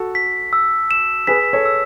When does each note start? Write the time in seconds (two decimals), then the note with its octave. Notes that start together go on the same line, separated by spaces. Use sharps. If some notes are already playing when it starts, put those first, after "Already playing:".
Already playing: F#4 A4
0.15 B6
0.53 E6
0.91 E7
1.27 G#4 B4 B6
1.53 A4 C#5
1.65 E6